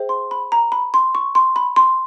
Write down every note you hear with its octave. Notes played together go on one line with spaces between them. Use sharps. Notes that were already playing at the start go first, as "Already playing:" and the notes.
Already playing: G#4 C5 E5 G5
C6
B5
A#5
B5
C6
C#6
C6
B5
C6